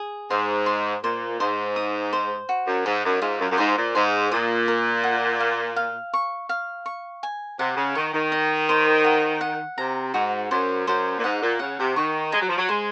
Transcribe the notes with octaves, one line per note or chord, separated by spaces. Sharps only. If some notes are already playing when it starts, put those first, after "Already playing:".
Already playing: G#4
G#2 C6
C6
A#2 C5
G#2 C5
D#6
C5
F#4
F#2
G#2 D#4
F#2
G#2 F4
F#2
F#2
G#2 C5
A#2
G#2 C6
A#2 D#6
A#4
F#5
F5
F5
C#6
F5
C#6
G#5
C3 F#5
C#3
D#3 C#6
D#3
D#5
C5
F#5
F#5
C3 A#5
G#2 F#4
F#2 C5
F#2 C5
A#2
G#2 F#5
A#2
C#3 F#5
C3
D#3 C#6
G#3 A#5
F#3
F3
F#3
G#3 C5